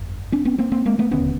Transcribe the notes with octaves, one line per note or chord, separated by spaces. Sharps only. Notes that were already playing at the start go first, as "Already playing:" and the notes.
Already playing: G1 F2
C4 D4
B3 C#4
A#3 C4
A#3 C4
G#3 A#3
A3 B3
E1 D#2 D3 B3 C#4